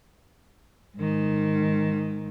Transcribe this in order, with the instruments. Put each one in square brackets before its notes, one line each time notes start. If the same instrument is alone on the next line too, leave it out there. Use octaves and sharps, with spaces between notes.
[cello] G#2 D#3